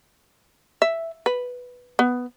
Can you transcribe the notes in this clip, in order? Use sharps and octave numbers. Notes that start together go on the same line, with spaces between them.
E5
B4
B3